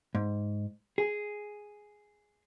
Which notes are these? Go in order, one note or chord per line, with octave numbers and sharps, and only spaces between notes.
G#2
G#4